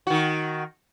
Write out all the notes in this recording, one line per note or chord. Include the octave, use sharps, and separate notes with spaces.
D#3 F#4